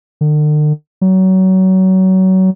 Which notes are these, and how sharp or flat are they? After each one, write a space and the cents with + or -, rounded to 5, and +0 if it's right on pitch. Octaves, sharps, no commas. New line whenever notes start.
D3 +45
F#3 +25